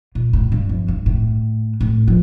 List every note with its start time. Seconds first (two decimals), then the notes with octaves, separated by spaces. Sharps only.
0.15 A#2
0.33 A2
0.52 G2
0.69 F2
0.88 G2
1.06 A2
1.81 A2
2.07 F3